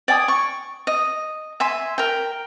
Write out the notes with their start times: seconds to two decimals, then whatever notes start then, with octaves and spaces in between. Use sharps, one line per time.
0.08 D5 G5 G#5 D#6
0.28 C#6
0.87 D#5
1.60 E5 G#5 C6
1.98 A#4 G5